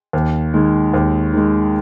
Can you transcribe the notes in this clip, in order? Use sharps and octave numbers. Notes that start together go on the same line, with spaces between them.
D#2
D#3 G#3
D#2
D#3 G#3